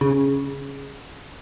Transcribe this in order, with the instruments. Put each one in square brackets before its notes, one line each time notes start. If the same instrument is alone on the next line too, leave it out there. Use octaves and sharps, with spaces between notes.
[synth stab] C#3